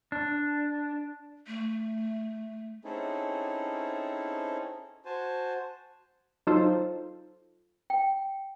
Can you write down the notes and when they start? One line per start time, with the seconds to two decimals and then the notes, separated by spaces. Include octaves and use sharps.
0.12 D4
1.47 A3
2.85 C4 C#4 D#4 E4 G#4 A4
5.05 F#4 C5 G#5 A5
6.47 F#3 D#4 F4 A4 C5
7.90 G5